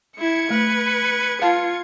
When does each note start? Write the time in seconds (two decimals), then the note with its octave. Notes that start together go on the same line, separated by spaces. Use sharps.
0.18 E4 G#6 C#7
0.50 A3 B4
1.41 F4 B4 F5 A5